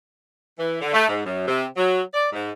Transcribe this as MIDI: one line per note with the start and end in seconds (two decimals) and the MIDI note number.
0.59 0.78 52
0.81 0.90 50
0.93 1.07 57
1.09 1.21 44
1.25 1.46 42
1.47 1.65 48
1.76 2.01 54
2.14 2.28 74
2.32 2.50 44